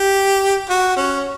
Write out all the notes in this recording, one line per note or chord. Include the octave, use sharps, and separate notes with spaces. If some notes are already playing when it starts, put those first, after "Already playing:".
Already playing: G4
F#4
C#4